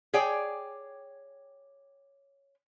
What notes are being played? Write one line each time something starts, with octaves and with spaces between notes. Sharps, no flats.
G#4 C#5 D5 G5 G#5